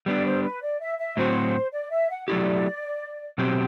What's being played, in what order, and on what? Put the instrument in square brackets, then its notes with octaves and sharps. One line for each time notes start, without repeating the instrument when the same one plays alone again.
[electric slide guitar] G3 B3 D4 [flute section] D5
[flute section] C5
B4
D5
E5
E5
[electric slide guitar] A2 F#3 C4 F#4 [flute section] C5
[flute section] D5
E5
F#5
[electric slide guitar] F#3 A3 E4 G4 [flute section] D5
[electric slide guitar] B2 F#3 C4 G4 [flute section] C5